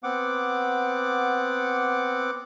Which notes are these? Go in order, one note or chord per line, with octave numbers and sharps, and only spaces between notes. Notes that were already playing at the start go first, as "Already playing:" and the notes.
B3 C4 F#5 D6